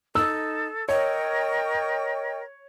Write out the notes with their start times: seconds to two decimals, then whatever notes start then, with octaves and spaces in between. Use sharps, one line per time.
0.15 D#4 A4 E6
0.89 A#4 C#5 D#5 G5 C#6